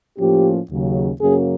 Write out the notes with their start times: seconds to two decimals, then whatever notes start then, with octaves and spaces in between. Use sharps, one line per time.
0.18 A2 F3 A#3 C#4 G4
0.69 D#2 C#3 F#3
1.20 F#2 C#3 F#3 A#3 C#4 G#4